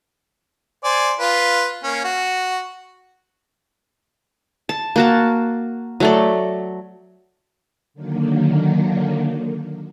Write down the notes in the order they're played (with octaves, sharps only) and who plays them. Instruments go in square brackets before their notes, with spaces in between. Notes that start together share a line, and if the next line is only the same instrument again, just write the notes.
[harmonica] C5 D5 G#5
F4 B4
A#3 C#4
F#4
[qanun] A5
A#3 F#4 A5
F#3 A3 D5
[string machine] D3 D#3 F#3 A#3